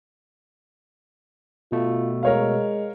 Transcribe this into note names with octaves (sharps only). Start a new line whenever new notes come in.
B2 A3 F4
G#3 A#4 C#5 F5